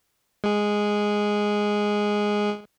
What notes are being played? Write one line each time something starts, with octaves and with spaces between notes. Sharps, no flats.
G#3 G#4